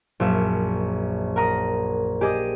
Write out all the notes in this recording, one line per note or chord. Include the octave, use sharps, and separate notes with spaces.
A#1 F#2 E5 E7
A#4 F#5 A#5 D#6
G4 G#4 D#5 D6 D#6